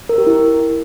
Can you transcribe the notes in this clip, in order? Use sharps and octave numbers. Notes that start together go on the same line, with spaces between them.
A#4
G4
E4